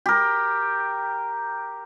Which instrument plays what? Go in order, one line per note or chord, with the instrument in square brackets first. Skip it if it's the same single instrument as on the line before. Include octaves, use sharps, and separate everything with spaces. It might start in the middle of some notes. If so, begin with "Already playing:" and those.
[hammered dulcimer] G4 A#4